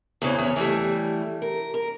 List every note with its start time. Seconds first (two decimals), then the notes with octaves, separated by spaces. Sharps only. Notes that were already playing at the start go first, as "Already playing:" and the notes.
0.22 E2 A#2 C#3 E3 C4
0.38 E2 A2 C#4
0.56 E3 G3 A3
1.42 A#4
1.74 A#4